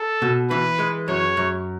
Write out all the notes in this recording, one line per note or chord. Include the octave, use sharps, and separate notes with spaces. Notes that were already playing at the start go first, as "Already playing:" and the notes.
Already playing: A4
B2
E3 B4
G#3
F#2 C#5
F#2